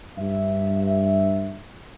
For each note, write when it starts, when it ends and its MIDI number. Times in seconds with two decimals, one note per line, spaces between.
0.17 1.56 43
0.17 1.56 76